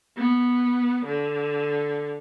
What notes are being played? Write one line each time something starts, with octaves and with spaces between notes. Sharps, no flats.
B3
D3